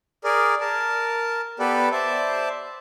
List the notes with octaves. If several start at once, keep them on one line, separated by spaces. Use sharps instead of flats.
G#4 A#4 D5
A#4 A5
B3 G4 A4 B4 D5
C5 D5 E5 A5